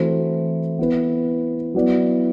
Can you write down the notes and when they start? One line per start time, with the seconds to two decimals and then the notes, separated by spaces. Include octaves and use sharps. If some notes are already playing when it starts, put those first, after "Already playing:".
Already playing: E3 A3 C4 F#4 C5
0.79 B3 E4 B4
1.74 F#3 B3 E4 B4 D5